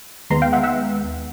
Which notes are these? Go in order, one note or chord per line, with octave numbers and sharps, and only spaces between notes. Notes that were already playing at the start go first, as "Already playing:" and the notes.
D#2 D#3 G#3 B3 A#5 C6
F5 G5
E5 F#5
E5 F#5